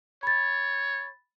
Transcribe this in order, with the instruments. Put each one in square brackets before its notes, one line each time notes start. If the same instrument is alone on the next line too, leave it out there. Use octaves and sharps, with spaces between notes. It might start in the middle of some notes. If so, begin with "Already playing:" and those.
[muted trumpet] C#5 [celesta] B5 A6